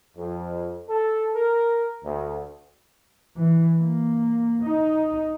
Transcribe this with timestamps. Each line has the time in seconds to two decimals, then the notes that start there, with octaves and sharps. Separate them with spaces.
0.16 F2
0.88 A4
1.35 A#4
2.04 D2
3.37 E3
3.81 A#3
4.63 D#4